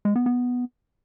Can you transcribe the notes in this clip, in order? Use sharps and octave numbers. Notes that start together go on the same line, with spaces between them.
G#3
B3
B3